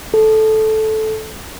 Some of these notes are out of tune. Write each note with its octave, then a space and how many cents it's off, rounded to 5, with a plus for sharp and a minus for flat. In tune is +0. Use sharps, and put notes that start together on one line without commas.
A4 -10